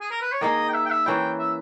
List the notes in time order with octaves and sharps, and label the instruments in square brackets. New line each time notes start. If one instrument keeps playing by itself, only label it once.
[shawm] G#4
A#4
B4
C#5
[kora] D#3 A#3 D#4 G#4 [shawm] D#5
[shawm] G5
E5
G5
E5
[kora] E3 A#3 C#4 E4 [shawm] G5
[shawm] E5